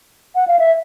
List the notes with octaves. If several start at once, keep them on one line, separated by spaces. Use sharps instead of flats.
F#5
F5
E5